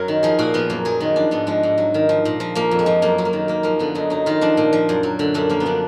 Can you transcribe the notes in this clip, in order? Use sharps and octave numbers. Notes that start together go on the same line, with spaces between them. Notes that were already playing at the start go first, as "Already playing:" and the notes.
Already playing: F#2 F#3 A#4
D#3
F3 G#4
A#2 F#4
F3 B3
F#2 A#3
F#3 G#4
D#3 B3
F3 D4
G#2 B3
F3 G#3
G#2
F#3
D#3
F3
A#2
F3
F3 A#3
F2
G#3
F3
F#2 A#3
F#3
A#3
D#3
F#2 A#3
F3 A#3
D3 B3
F#2 D#4
F#3 D#4
D#3 F4
F3 D4
A#2
F3
F#2
F#3
D3
F#2 D4
F3 A#3
B3
D3 D4